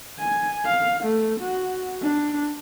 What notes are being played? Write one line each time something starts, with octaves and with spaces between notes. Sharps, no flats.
G#5
F5
A3
F#4
D4